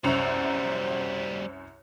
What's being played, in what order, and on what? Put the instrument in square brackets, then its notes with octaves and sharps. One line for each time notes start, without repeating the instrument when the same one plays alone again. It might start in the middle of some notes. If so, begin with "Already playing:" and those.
[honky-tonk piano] C2 F#2 F7 [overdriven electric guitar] G3 F#4 [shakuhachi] C5